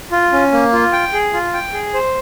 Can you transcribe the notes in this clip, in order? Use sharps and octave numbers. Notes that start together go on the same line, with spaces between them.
F4
C#4
A#3
F4
G5
G#4
F4
G5
G#4
C5